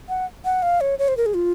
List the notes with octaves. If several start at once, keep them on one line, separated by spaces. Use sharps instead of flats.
F#5
F#5
F5
C#5
C#5
C5
A#4
G#4
F4